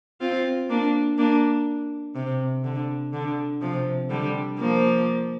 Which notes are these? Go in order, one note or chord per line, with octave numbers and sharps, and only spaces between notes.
C4 F4
A#3 D4
A#3 D4
C3
D3
D3
C3 F3
D3 G3
F3 A#3